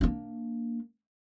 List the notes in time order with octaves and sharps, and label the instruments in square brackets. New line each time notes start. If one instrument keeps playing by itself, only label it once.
[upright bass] A#3 D4